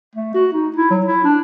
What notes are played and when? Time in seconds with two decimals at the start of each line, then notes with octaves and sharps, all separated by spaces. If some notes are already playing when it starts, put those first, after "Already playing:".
0.15 A3
0.34 F#4
0.52 D#4
0.77 E4
0.90 F#3
1.06 E4
1.24 D4